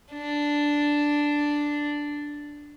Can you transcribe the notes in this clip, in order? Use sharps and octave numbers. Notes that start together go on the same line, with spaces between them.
D4